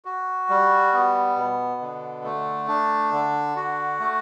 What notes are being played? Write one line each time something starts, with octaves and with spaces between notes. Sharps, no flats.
F#4
G3
B3
B2
D3
A3
D4
D3
F#4
A3